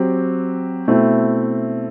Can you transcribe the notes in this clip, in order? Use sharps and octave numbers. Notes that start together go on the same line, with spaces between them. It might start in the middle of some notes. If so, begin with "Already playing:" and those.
Already playing: F#3 C4 G4
B2 A3 C4 E4